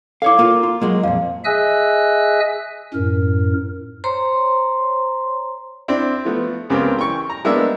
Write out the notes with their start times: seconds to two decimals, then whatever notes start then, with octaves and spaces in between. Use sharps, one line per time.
0.22 E4 A4 C#5 F5 D6
0.39 A#3 F4
0.63 F4
0.82 F#3 G#3 A#3
1.03 F2 A#2 F5
1.45 G#4 D#5 E5 G#5 E6 F#6
2.94 F#2 A2 A#4
4.04 C5 C#5 A#5 C6
5.88 C4 D4 E4
6.25 F3 A3 B3
6.70 C#2 C#3 B3 C4 G4 A#4
6.96 E3 G5 C#6
7.30 A#5
7.44 G3 G#3 A#3 B3 D4 E5